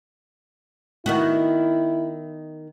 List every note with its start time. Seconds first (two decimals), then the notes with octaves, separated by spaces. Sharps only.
1.06 D#3 B3 E4 F#4